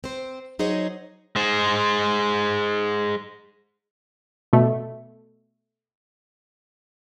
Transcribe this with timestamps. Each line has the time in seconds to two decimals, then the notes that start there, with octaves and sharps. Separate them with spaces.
0.04 C4 C5
0.59 F#3 D#4 G#4 C5 C#5 D#5
1.36 G#3 C5
4.53 B2 A3